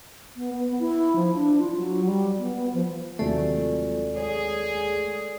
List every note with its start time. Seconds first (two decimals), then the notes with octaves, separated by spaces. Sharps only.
0.36 B3
0.54 B3
0.79 E4
1.16 F3
1.35 D4
1.59 F4
1.76 F#3
2.06 G3
2.38 B3
2.56 B3
2.73 F3
3.19 D#2 C3 F3 F#3 G#3 A3 A4 D5
4.17 G#4 C#5